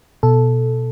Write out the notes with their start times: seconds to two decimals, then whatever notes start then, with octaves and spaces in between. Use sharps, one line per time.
0.23 B2 A4